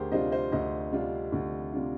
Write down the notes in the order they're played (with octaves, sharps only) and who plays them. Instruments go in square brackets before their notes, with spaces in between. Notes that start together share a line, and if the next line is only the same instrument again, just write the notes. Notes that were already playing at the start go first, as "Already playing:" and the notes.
Already playing: [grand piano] D2 G4 G#4 A#4 C5
C3 G3 D4 F4 C5 D#5
C5 D#5
D2 C5 D#5
C3 G3 D4 F4
D2
C3 G3 D4 F4